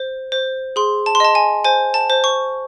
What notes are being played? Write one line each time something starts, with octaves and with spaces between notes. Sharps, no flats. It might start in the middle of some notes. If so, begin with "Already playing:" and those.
Already playing: C5
C5
G#4 C6
A5
C6
D#5 A5
G#5
C5 G#5
A5
C5
C#6